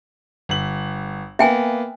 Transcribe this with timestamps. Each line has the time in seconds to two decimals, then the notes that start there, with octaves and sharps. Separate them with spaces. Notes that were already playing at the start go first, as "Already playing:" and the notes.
0.49 G1 F#7
1.39 A#3 B3 E5 G5 G#5